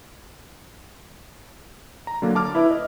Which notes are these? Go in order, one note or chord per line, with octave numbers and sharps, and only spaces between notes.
A#5
D3 F#3 A#3 D4
A5 D6 F6
E4 B4 E5
D#5